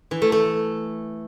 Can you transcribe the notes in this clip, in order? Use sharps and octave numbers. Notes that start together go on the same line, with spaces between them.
E3
A3
A3